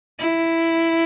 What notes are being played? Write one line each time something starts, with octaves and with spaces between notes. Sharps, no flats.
E4